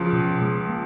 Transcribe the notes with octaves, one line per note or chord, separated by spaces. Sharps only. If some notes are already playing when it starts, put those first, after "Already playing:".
Already playing: C#2 C#3 F3
B2
G#3
A#3